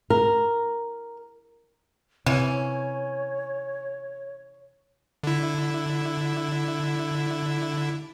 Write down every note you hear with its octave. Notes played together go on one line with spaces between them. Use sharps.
A#4
C3 E3 C#4 C#5
D3 E4